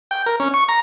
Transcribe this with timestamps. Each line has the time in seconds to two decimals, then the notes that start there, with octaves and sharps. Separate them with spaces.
0.11 G5
0.26 A#4
0.40 C#4
0.54 C#6
0.69 A#5